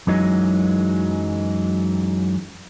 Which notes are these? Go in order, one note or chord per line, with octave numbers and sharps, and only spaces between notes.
F#2 E3 F#3 G#3 D#4